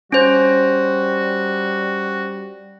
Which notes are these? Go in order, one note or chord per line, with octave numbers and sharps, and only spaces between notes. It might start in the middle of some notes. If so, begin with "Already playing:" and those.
G3 C#4 F#4 C5